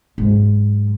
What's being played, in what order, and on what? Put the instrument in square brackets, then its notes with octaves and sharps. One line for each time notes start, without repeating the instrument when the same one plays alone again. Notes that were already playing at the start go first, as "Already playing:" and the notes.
[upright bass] G#2 F#3